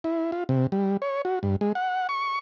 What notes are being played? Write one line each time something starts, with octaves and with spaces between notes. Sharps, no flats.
E4
F4
C3
G3
C#5
F#4
G2
G#3
F#5
C#6